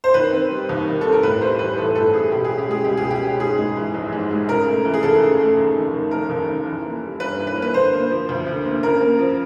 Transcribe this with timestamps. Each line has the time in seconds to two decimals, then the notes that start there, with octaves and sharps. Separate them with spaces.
0.04 C5
0.14 D#3 B4
0.32 C4
0.51 G3
0.69 D#2
0.87 D#3
1.01 C4 A4
1.12 A#4
1.23 A2 B4
1.41 G3 C5
1.59 E3 B4
1.77 A1 A4
1.95 A2 A4
2.13 G3 G#4
2.32 B2 G4
2.45 C#4 G#4
2.58 G4
2.68 G#3 G#4
2.84 C#2 G4
2.97 G#4
3.04 B2
3.10 G4
3.22 C#4
3.40 G#2 G#4
3.58 G#3
3.76 E3
3.94 A#1
4.12 G#2
4.31 G#3
4.49 C#3 A#4
4.67 A3
4.85 E3
4.94 G#4
5.03 D#2 A4
5.21 C#3
5.39 A3
5.57 D#2
5.76 F1
5.93 D#3
6.11 F1 A#4
6.29 D#2
6.48 F1
6.65 E3
6.84 A#3
7.02 G3
7.20 G2 B4
7.38 E3
7.47 B4
7.56 A#3
7.62 B4
7.74 D3 C5
7.92 A#3
8.11 F3
8.29 D2
8.47 D3
8.65 A#3
8.83 C#3 A#4
9.01 A#3
9.19 F3